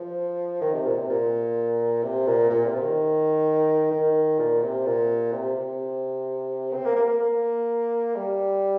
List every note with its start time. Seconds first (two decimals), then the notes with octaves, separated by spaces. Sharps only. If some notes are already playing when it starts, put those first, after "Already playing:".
Already playing: F3
0.61 D#3
0.73 C3
0.86 A#2
0.97 C3
1.09 A#2
2.03 C3
2.26 A#2
2.50 A#2
2.65 C3
2.76 C3
2.81 D#3
3.91 D#3
4.38 A#2
4.62 C3
4.86 A#2
5.32 C3
5.55 C3
6.74 C4
6.85 A#3
6.96 A#3
7.09 A#3
7.20 A#3
8.15 G3